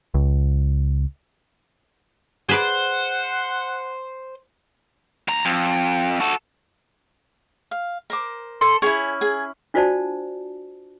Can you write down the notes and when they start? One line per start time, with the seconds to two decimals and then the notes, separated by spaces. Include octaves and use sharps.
0.14 C#2
2.49 G#4 B4 C5 D5 F#5
5.28 D2 A#5
5.45 F2
6.20 F#4 A4
7.71 F5
8.10 A#4 C5 D6
8.61 A4 C6
8.82 C#4 E4 G#4 G#5
9.21 G#4 G#5
9.74 D4 F4 F#4 C5 D5 A5